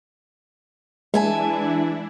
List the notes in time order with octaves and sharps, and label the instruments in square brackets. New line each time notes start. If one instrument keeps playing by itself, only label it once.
[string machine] E3 D4 E4 [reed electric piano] G#3 [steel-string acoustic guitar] E5 G#5 A5